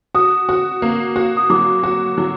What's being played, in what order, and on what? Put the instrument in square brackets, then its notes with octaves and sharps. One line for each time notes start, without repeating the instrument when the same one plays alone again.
[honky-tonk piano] F#4 [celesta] D#6
[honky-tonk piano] F#4
A#3
F#4
[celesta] D#6
[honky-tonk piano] F#3 [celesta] D6
[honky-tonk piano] F#4
F#3